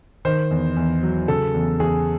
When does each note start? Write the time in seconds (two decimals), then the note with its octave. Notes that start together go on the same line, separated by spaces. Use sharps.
0.25 D#3 C5
0.51 E2
0.76 E2
1.03 F#3
1.28 C#3 A4
1.54 E2
1.80 E2 G#4